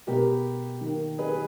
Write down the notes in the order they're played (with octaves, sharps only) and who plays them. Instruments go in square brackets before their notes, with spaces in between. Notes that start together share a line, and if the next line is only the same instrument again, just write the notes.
[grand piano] B2 G#3 B3 G4 A#4
D#3 A#3
G#4 B4
G#4